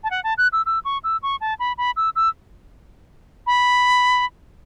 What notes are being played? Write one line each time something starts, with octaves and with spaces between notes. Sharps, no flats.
A5
F#5
A5
F#6
E6
E6
C#6
E6
C#6
A5
B5
B5
E6
E6
B5